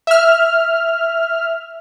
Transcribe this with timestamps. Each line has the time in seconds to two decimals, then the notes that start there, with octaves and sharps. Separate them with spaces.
0.07 E5 F6